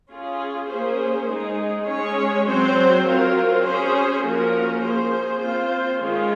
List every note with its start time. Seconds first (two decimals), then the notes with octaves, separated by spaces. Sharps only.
0.11 C#4 F4 G#4
0.69 A#3 C#4 G#4 C5
1.29 G#3 D#4 G#4
1.87 G#3 C#4 G#4 C#5
2.46 F#3 C4 F#4 C5
3.06 F#3 C4 F4 A#4
3.64 C#4 G#4 C5
4.24 F3 A#3 C#4 F#4 A#4
4.83 A#3 C#4 G#4 C5
5.41 C4 F4 C5
6.01 D#3 G#3 C#4 F4 G#4